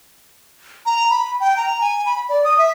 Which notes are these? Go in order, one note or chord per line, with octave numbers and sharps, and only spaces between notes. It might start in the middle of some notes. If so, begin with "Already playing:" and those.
A#5
B5
G5
A#5
G#5
B5
D5
D#6
E5